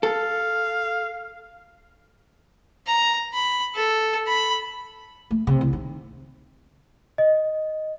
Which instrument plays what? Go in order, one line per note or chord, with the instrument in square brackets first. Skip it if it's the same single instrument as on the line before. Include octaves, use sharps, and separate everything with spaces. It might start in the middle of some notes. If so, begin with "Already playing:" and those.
[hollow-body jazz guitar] A4 [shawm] F5
[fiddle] A#5
B5
A4
B5
[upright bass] A3
C3
C2
D#3
[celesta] D#5